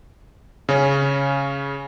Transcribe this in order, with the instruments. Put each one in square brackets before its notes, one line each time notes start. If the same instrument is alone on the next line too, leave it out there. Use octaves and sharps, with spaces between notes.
[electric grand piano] C#3 C#4